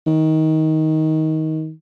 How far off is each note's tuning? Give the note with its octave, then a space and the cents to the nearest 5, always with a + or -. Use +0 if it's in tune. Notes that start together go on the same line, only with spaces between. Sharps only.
D#3 +20